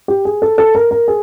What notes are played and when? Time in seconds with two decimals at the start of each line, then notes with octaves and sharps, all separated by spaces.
0.08 G4
0.25 G#4
0.42 A4
0.58 A4
0.75 A#4
0.91 A#4
1.08 G#4